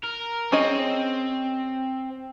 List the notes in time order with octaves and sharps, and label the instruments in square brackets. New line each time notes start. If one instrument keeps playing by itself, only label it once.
[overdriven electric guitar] A#4
[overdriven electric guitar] C4 [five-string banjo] C#4 G#4 D#5